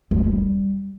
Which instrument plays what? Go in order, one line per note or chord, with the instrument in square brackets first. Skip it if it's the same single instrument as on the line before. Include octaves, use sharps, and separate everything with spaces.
[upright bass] F2
E3
G3